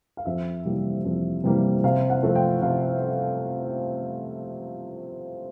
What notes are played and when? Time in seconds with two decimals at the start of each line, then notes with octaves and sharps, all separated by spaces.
0.17 F5
0.25 F2 E5
0.65 C3 E3 G3 A#3
1.05 F2
1.44 C3 E3 G3 A#3
1.84 C3 F5
2.10 F#5
2.23 F3 A3 C4
2.35 G5
2.62 C3 F5